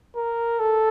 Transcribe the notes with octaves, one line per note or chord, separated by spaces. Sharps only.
A#4
A4